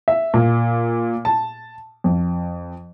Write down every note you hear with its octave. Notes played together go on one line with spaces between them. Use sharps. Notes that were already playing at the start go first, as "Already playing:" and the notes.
E5
A#2
A5
F2